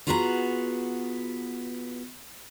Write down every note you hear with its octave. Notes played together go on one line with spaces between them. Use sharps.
B3 F4 F#4 G#4 B4 A#5